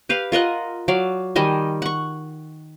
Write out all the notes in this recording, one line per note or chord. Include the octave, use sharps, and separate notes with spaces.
G4 B4 F5
F4 A#4 D#5 F#5
F#3 D5 F5
D#3 G3 D#5 G#5
F#5 C#6